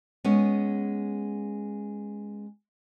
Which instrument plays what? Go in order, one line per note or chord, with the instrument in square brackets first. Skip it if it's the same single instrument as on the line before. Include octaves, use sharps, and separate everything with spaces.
[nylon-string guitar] G#3 B3 C#4